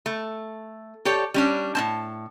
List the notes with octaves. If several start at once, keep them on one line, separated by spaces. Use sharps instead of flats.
A3
G4 A4 C#5 D5
G3 C#4 D4
A2 C4 A5